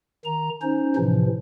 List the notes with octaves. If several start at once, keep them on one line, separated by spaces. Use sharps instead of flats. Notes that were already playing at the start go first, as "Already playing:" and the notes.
D#3 A#5
C#4 D#4 C5
A2 C3 E3 F3